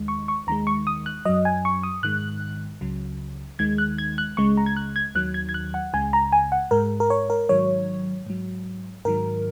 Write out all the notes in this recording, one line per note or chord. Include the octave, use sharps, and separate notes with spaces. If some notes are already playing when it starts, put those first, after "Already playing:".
Already playing: D#2 D#3 G#3
C#6
C#6
D#2 D#3 G#3 A#5
C#6
D#6
F#6
F#2 F#3 D#5
G#5
C#6
D#6
G#2 D#3 G#3 F#6
C#2 C#3 F#3
D#2 D#3 G#3 G#6
F#6
G#6
F#6
C#2 C#3 G#3 C#6
A#5
G#6
F#6
G#6
D#2 D#3 F#3 F#6
G#6
G#6
F#6
F#5
C#2 C#3 G#3 G#5
A#5
G#5
F#5
G#2 G#3 A#4
A#4
C#5
A#4
G#2 D#3 F#3 C#5
G#2 F#3
G#2 D#3 F#3 A#4